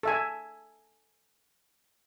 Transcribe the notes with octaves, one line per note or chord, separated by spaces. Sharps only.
A4 E5 G#5